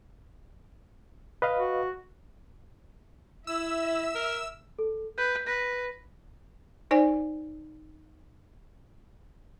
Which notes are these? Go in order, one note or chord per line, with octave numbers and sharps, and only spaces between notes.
B4 D#5 F5
F#4
E4 E5 E6
A#4
A4
B4 G6
B4 A#6
D#4 C5 D5 G#5